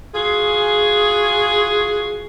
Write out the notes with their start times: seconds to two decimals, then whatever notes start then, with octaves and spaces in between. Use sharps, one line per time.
0.14 F4 F#4 G#4